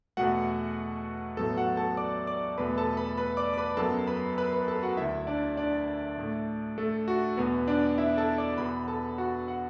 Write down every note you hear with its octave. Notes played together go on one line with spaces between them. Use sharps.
E2 B2 A3 F#4 F#5
A1 A2 F#3 B3 A4 A5
F#4 F#5
A4 A5
D5 D6
D5 D6
E2 B2 A3 B4 B5
A4 A5
B4 B5
B4 B5
D5 D6
D6
B4 B5
F#2 F#3 B3 A4 A5
B4 B5
B4 B5
B4 B5
A4 A5
F#4 F#5
D2 D3 A3 E4 E5
D4 D5
D4 D5
A2 A3
A3 A4
F#4
E2 B2 B3 B4
D4 D5
E4 E5
A4 A5
D5 D6
E2 B2 B3 B4 B5
A4 A5
F#4 F#5
F#5